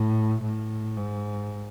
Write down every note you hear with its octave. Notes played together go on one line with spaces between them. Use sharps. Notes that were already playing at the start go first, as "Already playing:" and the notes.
Already playing: A2
A2
G#2